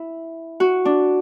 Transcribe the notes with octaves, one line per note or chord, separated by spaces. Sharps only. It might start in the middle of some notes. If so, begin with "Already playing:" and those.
Already playing: E4
F#4
D4